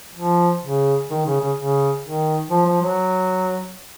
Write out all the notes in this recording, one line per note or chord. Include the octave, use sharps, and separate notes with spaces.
F3
C#3
D#3
C#3
C#3
C#3
D#3
F3
F3
F#3